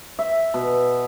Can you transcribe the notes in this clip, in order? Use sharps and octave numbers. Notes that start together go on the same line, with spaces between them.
E5
B2